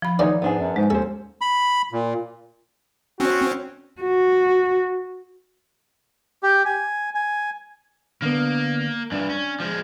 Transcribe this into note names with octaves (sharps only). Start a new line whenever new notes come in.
F3 B5
D2 D3 E3 D#4 F4 C#5
G#2 B3 D4 G#4
F#2
G#2 G#3
D#2 C#4 A4 C5
B5
A#2
C4 C#4 F#4
F#4
G4
G#5
G#5
D3 A#3 B3
G2 E3 D4
C#4
F3 G#3